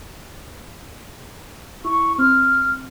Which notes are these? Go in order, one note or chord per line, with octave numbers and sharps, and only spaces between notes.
E4 C#6
C4 F6